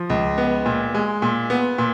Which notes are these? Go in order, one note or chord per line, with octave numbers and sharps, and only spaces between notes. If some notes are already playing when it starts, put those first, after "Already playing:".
Already playing: F3
C#2
B3
A#2
G#3
A#2
B3
A#2